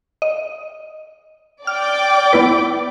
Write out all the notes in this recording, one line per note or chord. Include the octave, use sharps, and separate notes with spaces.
D#5
D5 G5 D6 F6
B3 E4 B4